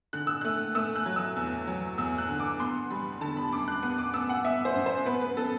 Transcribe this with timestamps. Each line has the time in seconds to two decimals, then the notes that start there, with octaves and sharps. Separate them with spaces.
0.13 D3 F#6
0.27 E6
0.41 A3 F#6
0.75 A3 E6
0.96 F#6
1.06 F#3
1.16 E6
1.36 E2
1.67 F#3
1.98 E2 E6
2.18 F#6
2.29 D3
2.40 D6
2.59 B3 C6
2.91 G3 B5
3.21 D3 A5
3.37 B5
3.52 F#2 D6
3.68 F#6
3.83 B3
3.98 D6
4.14 B3 E6
4.29 F#5
4.45 B3 E5
4.65 C5
4.76 F#2
4.86 C5
5.06 B3 B4
5.21 B4
5.37 B3 A4